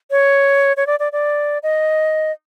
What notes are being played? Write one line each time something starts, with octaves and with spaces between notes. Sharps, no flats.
C#5
C#5
D5
D5
D5
D#5